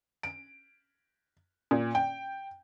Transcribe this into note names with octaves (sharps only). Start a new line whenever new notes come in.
D7
A#2
G5